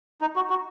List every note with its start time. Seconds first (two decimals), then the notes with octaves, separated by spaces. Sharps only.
0.21 D#4
0.36 F#4
0.50 F#4